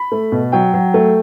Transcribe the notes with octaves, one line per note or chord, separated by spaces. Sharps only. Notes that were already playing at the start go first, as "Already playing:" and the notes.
Already playing: B5
A3
B2
F#3 G5
F#3
A3